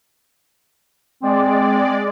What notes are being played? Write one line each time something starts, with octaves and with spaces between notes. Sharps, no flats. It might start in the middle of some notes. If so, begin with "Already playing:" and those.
G#3 C4 D5